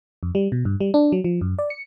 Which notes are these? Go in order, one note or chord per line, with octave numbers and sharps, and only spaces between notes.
F2
G3
B2
G2
G3
D4
F#3
F3
F#2
D5
C#7